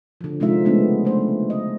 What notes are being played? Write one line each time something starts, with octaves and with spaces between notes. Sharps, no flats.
D3 F3
C3 F3 G#3 D#4 F4 E5
C#3 G#3 A3 B3 D4
A3 C5
D#5